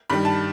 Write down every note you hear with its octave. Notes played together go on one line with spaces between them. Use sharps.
G2 D#3 G3 B5
A5